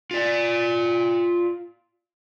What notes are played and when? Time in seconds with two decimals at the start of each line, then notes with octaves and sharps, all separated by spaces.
0.11 F4 D5